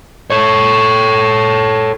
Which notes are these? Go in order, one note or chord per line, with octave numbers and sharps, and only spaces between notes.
A4 C#5